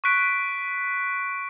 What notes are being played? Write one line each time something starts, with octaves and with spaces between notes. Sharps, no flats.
C#6 F#6 B6 D7